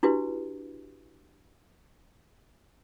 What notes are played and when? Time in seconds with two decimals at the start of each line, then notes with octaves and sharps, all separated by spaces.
0.03 D4 E4 F#4 G4 B4